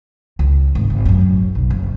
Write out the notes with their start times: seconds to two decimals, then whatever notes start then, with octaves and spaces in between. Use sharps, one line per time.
0.39 C#2
0.75 G#1
0.90 G#1
1.05 A1 F#2
1.55 B1
1.70 F#1